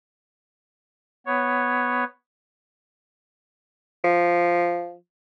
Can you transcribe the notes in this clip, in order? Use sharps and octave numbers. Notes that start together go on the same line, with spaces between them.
B3 C#5
F3